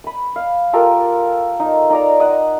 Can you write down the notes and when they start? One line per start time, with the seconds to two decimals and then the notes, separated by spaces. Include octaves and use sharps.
0.04 B5 D#6
0.36 F5
0.73 F4 G4 A4 A#4
1.60 D#4
1.90 D#4 D5 A#5
2.20 D#5 F#5